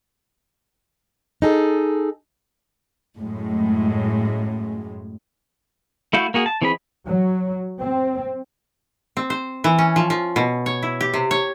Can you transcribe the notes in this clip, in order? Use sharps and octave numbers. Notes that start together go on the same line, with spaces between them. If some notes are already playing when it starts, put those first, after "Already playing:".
D#4 G#4 A4
F#2 A2 G#3
A3 E4 F#4 F5 G6
A#3 F#4 G#4
A5
E3 C4 G#4 D#5 B5
F#3
C4
C4
C5
E3
C#4
F3
F3
B2
C#5
E4
G4
C3
C#5